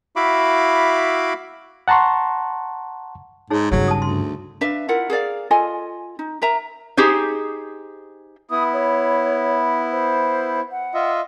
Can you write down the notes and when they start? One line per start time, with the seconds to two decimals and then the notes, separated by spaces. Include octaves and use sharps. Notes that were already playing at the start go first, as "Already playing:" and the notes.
0.16 E4 F#4 E5 F5 B5 D6
1.88 F#5 A5 A#5 C6 C#6
3.50 G#2 D#4 G#4 C#5
3.72 G2 C#3 F#3
3.88 A5 D#6
4.02 D2 C6
4.61 D4 B4 E5 F5
4.88 E4 F4 A#4 F#5
5.10 G#4 A#4 D5 F5
5.51 F4 A4 D#5 G#5
6.19 D#4
6.42 A#4 E5 A#5
6.97 D#4 G4 G#4 C5
8.49 B3 E4 D#6
8.73 C#5
9.91 C5
10.71 F#5
10.94 F4 D#5 E5